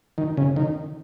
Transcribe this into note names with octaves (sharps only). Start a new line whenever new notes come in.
D#3
C#3
D#3